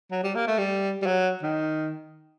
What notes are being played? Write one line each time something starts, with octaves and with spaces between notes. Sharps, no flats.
F#3
G3
A#3
A3
G3
G3
F#3
D#3